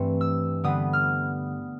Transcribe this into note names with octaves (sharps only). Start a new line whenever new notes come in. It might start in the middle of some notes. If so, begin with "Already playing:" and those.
Already playing: G2 E3 A3 C4
E6
D3 G3 B3 D#6
F6